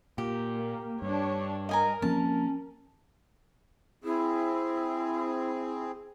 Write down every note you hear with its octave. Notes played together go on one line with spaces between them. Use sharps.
A#2 G4
A#3
G2 D4 C#5
A#4 D#5 G#5 A#5
F3 A#3 C4 C#4 A5
C4 E4 G#4